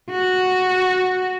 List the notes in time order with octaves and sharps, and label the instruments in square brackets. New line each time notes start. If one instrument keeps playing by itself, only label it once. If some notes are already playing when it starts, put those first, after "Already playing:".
[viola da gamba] F#4